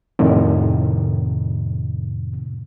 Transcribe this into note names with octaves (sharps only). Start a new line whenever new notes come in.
F2 A2 C3 D#3